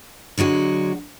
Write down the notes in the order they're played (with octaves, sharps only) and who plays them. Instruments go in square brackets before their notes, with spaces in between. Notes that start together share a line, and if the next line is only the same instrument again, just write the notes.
[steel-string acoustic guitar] D3 F#3 G#3 F#4